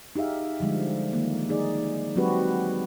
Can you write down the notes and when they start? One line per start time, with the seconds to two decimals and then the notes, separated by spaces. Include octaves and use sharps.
0.15 D#4 G4 G#4 E5 F5
0.60 D3 F3 G3 G#3
1.13 D#3 A#3
1.49 D#4 G#4 D5
2.16 F#3 G#3 C4 F#4 G4 B4